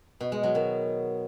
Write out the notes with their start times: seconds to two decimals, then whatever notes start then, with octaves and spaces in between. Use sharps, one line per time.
0.20 B2
0.32 G#3
0.43 F#3
0.55 D#3